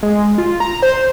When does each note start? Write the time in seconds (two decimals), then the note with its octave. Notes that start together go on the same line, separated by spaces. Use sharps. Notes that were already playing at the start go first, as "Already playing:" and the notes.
0.03 G#3
0.38 F4
0.60 A#5
0.83 C5